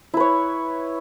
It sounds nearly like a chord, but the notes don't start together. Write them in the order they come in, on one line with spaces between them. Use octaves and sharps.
E4 B4 C#5